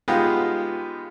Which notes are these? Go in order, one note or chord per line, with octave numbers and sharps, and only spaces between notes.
G#3 B3 D#4 F4 G4